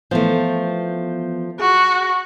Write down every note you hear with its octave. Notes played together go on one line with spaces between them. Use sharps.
E3 F3 A3 B3 G6
F#4 G#4